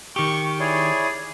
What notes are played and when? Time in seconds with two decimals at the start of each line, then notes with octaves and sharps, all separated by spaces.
0.16 D#3 G4 C#6
0.60 E4 G#4 C#5 D5